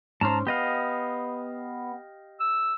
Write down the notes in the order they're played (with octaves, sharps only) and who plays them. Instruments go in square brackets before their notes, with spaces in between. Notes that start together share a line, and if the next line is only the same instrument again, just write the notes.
[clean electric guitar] G#2 C#4 C5 [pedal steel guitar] A5 A#5
[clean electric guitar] B3 [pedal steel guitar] G4 D#5 F5
[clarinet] E6